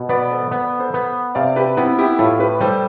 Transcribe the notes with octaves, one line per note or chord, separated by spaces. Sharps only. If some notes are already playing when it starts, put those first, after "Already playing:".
Already playing: B2
B3 B4 D5
A4 C5
B3 B4 D5
A4 C5
B3
C3 D5 F5
G4 B4
B3 C4 E4
E4 G4
A2 F4 A4
G4 B4
G3 A4 C5